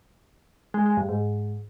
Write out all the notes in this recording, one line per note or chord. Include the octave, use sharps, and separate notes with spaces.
G#3
G#3
G2
G#2